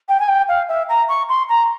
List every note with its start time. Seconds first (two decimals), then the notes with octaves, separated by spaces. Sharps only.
0.08 G5
0.20 G#5
0.28 G5
0.48 F5
0.68 E5
0.89 A#5
1.08 C#6
1.29 C6
1.49 A#5